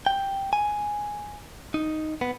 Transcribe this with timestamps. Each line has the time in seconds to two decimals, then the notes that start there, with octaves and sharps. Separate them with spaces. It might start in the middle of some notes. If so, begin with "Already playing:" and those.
0.06 G5
0.53 G#5
1.74 D#4
2.21 B3